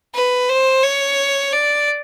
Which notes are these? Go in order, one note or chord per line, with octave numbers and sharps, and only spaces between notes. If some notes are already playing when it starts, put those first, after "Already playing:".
B4
C5
C#5
D5